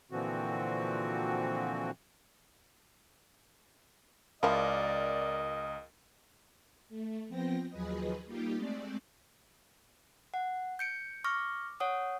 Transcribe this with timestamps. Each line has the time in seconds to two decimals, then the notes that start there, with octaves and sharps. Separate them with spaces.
0.12 A#2 D3 E3 F3 C4 F#4
4.43 C#2 F3 E4 A#4 D5 D#5
6.89 A3
7.28 F3 B3 C4 G5 A#6
7.69 D#2 F3 F#3 G#4 B4 D#5
8.26 G3 A#3 D#4 F4 G4
8.57 G#3 A3 C4 D5
10.34 F#5
10.79 G6 C#7 D7
11.24 C#6 D6 F6 A#6
11.80 C#5 F#5 D#6